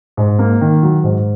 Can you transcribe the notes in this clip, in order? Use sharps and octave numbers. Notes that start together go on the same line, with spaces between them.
G#2
A#3
D#3
F#3
G#2